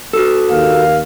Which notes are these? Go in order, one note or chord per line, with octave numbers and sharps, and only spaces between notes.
F#4 A4
D#2 A#3 F5